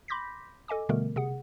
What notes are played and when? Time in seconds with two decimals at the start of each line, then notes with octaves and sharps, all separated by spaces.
0.08 B5 C6 D6 G6 A#6 B6
0.68 A4 D#5 G#5 D6
0.89 B2 D3 G3 A3 B3 A#4
1.16 C3 G#4 F#5